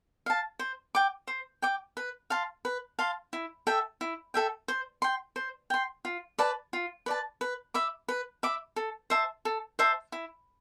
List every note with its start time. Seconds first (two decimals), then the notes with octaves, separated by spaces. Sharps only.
0.26 F5 A5
0.59 C5
0.95 G5 D6
1.27 C5
1.62 G5 D6
1.97 B4
2.30 F5 A5 C6
2.65 B4
2.99 F5 A5 C6
3.33 E4
3.67 A4 E5 G5
4.01 E4
4.34 A4 E5 G5
4.68 C5
5.02 G5 C6
5.36 C5
5.70 G5 C6
6.05 F4
6.39 B4 D5 A5
6.73 F4
7.06 B4 D5 A5
7.41 B4
7.74 E5 B5 D6
8.08 B4
8.43 E5 B5 D6
8.76 A4
9.10 C5 E5 A5
9.45 A4
9.79 C5 E5 A5
10.12 E4